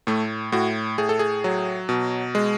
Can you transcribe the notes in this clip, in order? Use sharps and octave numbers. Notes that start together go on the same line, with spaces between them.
A2 A3
A2 F#4
A2 G#4
A4
G#4
F#3
B2
G#3